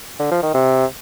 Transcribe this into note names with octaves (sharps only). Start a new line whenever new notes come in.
D3
F3
D#3
C3